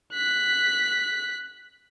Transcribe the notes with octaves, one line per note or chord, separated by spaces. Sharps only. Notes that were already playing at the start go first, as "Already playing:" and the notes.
F#6 B6